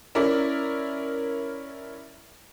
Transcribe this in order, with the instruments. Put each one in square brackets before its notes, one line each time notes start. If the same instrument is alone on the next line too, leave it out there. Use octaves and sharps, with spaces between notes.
[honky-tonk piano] C#4 E4 A#4 D5 E5